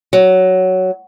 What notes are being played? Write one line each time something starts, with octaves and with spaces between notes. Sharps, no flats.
F#3